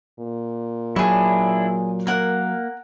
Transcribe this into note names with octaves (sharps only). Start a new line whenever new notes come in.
A#2
F#3 D4 E4 G#4 C#6
A#3 A#4 F#5